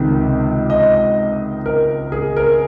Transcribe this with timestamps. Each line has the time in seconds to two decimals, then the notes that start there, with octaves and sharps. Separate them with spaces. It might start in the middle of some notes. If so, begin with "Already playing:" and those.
Already playing: C#2 C3 D#3
0.70 D#5
1.66 A#4
2.12 G#4
2.37 A#4